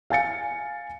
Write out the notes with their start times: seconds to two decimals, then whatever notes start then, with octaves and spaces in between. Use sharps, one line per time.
0.10 F5 G#5 A6 C#7